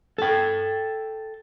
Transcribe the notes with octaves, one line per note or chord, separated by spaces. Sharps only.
A4 G5